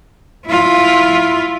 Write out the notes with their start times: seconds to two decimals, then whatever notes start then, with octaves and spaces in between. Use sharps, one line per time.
0.46 E4 F4